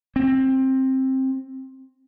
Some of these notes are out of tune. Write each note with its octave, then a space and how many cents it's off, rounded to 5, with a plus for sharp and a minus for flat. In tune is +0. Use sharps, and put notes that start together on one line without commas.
C4 +15